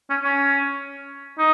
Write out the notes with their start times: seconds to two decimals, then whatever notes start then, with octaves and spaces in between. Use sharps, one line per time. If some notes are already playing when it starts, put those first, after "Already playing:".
0.10 C#4
0.23 C#4
1.38 D#4